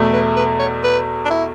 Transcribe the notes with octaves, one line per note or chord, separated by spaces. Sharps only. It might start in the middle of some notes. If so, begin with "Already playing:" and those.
Already playing: E2 B2 A3
B4
B4
C#5
B4
D4
E4